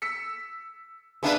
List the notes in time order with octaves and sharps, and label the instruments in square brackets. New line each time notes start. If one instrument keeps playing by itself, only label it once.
[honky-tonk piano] E6 B6 C#7
[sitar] B3 D4 B4 [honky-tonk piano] G#4 E5 F5